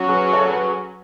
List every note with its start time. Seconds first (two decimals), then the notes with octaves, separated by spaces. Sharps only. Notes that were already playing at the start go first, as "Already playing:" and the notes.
Already playing: F#3 C#4 F#4
0.08 G#4 B4
0.33 A4 C#5
0.49 G#4 B4